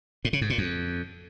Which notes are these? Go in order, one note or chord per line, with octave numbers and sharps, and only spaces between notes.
A2
C#3
G#2
A#2
F2